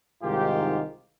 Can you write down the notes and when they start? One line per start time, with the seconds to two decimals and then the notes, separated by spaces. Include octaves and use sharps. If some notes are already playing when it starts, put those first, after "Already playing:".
0.24 C2 G#2 D#3 F4 G4